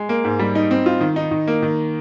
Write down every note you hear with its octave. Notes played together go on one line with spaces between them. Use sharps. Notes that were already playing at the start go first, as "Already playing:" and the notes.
Already playing: G#3
A#3
G#2
G3
D#4
C4
F4
D#3
D#4
D#3
A#3
D#3